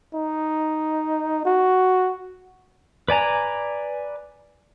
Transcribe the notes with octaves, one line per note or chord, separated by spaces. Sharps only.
D#4
F#4
B4 D5 G#5 A#5